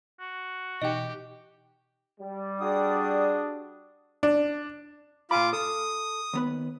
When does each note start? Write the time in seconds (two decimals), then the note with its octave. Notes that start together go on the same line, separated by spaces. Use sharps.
0.20 F#4
0.82 B2 E3 D#4 G4 D#5 G5
2.20 G3
2.60 D4 F#4 G#4 D#6
4.23 D4
5.31 A#2 F4 G#5 B5 D6
5.53 A4 D#6
6.33 D#2 B3 B4